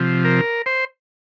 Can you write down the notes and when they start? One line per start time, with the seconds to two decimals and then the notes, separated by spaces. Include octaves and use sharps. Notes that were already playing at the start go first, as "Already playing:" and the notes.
Already playing: C3 F3
0.25 A#4
0.66 C5